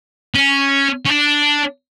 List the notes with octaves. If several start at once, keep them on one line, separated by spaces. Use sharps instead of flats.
C#4
C#4
D4